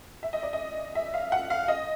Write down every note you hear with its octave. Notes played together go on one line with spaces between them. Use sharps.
E5
D#5
D5
D#5
E5
F5
F#5
F5
D#5